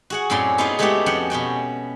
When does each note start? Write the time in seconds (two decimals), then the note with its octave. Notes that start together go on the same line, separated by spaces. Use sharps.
0.10 F#4 G#4 F#5
0.30 F#2 A2 C4 C#4 D5 C6
0.58 B3 D#4 F4 F#4 G#4 C5
0.79 G#3 A3 B3 E4 F#4 G4
1.06 F2 C#4 F#4 F#5 G5
1.30 B2 C#4 F#4 G5